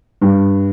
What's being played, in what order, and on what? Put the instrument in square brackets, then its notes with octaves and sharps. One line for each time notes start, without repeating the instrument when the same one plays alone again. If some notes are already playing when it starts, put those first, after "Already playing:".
[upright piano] G2